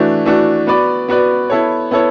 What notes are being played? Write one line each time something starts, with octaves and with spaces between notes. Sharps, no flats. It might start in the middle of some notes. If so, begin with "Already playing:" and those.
Already playing: E3 A3 D4 F#4
E3 A3 D4 F#4
B3 F#4 B4 D5
B3 F#4 B4 D5
B3 E4 A4 C#5
B3 E4 A4 C#5